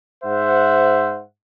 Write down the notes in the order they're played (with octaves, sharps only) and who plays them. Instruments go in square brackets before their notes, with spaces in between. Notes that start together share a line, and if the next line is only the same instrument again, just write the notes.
[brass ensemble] G#2 C5 E5 F#5